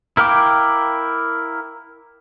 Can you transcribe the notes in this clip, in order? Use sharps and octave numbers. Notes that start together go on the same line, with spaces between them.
E4 A#4 F5 G5 D6